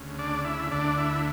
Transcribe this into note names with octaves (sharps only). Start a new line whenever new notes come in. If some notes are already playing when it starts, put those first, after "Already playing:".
Already playing: D2 C#3
D4 D5
E4 E5
D2 D3 D4 D5
E4 E5